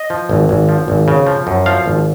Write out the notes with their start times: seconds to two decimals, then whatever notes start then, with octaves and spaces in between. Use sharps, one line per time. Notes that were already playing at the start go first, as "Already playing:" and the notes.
Already playing: D#5
0.10 F3
0.29 G#1
0.49 G#1
0.69 F3
0.88 G#1
1.08 C#3
1.27 F3
1.47 F#2
1.66 F3 F5
1.86 G#1